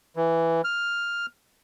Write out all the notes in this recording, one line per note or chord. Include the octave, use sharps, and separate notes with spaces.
E3
F6